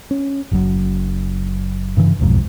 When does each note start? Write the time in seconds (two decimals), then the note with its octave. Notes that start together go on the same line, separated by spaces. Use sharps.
0.11 C#4
0.52 F#1 F#2
1.97 G2 C#3 E3
2.19 D#1 B1 F2 G#2